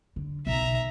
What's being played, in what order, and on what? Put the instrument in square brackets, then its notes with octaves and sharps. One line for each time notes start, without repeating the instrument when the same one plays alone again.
[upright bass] D3
[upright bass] B1 [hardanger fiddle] E5 A#5